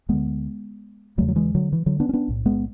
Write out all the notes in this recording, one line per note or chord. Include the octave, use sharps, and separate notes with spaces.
D2 D3 G#3 B3
E1 E2 C#3 F#3 A3
F#3
E3 G#3
D3 F#3
E3
D3 F#3
B3 D4
C#4
B3 D4
B1 A2
G#3 B3